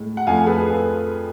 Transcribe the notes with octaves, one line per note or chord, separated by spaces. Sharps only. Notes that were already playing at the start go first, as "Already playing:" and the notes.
Already playing: A2 G#3
F#5
F2 F3 A3 F5 G#5
A4
G#4 B4